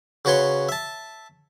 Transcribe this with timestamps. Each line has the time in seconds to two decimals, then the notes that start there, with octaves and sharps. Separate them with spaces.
0.25 C#3 F#4 B4 C#5 C6
0.69 E5 A5